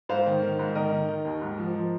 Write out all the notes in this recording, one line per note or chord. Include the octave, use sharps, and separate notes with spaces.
G#2 C5 F5
D#3
D#3
G#2
D#3 A#4 D#5
D#3
D#3
D#2
G#2
F3
F3